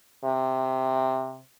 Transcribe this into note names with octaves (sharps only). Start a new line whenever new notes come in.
C3